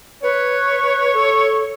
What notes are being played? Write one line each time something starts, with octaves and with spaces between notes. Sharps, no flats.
B4 C#5
A4